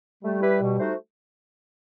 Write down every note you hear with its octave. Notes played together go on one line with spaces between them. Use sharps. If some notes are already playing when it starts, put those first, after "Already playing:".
G3 A3
E4 G4 B4
B2
A3 D#4 F#4 C5